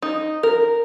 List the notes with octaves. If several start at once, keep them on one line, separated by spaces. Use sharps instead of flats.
D#4
A#4